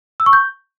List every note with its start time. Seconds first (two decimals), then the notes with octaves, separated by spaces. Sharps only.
0.20 E6
0.26 C#6
0.33 G6